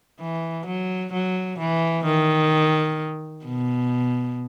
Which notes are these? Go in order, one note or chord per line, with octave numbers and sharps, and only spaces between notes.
E3
F#3
F#3
E3
D#3
B2